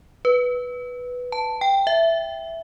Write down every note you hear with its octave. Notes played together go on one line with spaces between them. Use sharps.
B4
A5
G5
E5